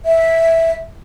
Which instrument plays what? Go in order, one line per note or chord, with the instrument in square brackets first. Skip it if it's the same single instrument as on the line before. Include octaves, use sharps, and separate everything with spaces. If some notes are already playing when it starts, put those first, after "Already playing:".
[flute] E5